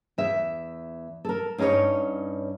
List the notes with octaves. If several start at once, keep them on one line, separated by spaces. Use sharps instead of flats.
E2 E5
A4 A#4
G2 C#4 D#4 G#4 C#5